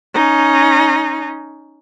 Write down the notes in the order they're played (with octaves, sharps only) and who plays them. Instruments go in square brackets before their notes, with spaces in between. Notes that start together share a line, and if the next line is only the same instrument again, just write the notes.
[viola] C#4 D#4